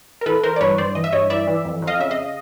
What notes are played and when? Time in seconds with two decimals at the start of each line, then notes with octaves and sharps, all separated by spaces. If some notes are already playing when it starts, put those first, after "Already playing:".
0.21 A#4
0.26 E3 A4 B4
0.43 E3 A#4 C5
0.56 D5
0.61 G2 B4 C#5
0.78 G2 C5 D5
0.95 E3 D#5
1.04 E5
1.13 G2 C#5 D#5
1.30 E3 D5 E5
1.47 E3
1.65 F2
1.82 F2
1.87 D#5 F5
2.00 C#3 E5
2.11 D#5 F5